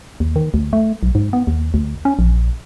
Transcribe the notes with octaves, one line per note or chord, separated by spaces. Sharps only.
D#2
D#3
D2
A3
B1
G#2
B3
D#2
D2
C#4
A#1